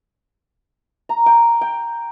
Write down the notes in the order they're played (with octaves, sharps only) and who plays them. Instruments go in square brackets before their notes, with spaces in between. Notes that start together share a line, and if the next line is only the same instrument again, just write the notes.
[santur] A#5
G5
G5